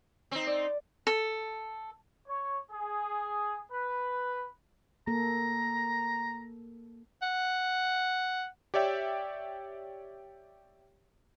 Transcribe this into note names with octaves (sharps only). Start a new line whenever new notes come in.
C4 D#4
D5
A4
C#5
G#4
B4
A#3 A4 A#5
F#5
G4 C#5 D5 E5 G5